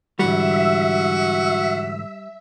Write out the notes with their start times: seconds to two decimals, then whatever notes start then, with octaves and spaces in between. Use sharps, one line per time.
0.19 G#2 D3 E3 G3 F#4 E5